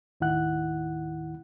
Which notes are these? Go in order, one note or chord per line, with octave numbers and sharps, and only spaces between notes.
D#2 A2 D#3 E4 F#5 F#6